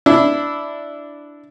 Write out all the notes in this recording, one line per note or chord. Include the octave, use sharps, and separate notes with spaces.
D4 E4